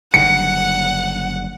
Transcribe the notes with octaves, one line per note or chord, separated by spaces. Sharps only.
F#1 D3 G3 F#5 C#7